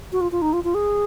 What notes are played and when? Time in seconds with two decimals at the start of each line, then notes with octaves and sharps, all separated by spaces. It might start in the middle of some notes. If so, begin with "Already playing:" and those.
0.12 F#4
0.21 F4
0.32 F4
0.42 D#4
0.53 F4
0.64 F4
0.74 G#4